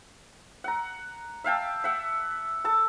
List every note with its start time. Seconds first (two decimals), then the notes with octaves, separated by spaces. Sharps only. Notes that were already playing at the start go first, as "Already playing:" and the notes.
0.64 F#5 A#5
1.44 E5 F5 G5 A5
1.84 E5 F#5
2.65 A4 A5 E6